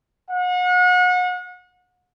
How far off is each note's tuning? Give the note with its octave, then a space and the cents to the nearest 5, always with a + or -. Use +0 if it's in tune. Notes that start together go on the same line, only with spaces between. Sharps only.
F#5 -35